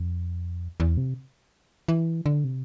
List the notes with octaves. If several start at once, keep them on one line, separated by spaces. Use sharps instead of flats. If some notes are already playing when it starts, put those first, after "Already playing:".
Already playing: F2
E2
C3
E3
D3
C3